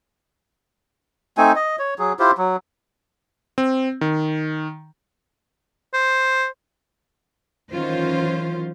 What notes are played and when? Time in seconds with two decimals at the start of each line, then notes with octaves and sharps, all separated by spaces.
1.38 A3 C4 D#4 G#5
1.56 D#5
1.79 C#5
1.99 F#3 G#4
2.19 E4 F4 G4 C5
2.38 F#3
3.58 C4
4.01 D#3
5.94 C5
7.72 D#3 E3 F#3 C#4 F4 C5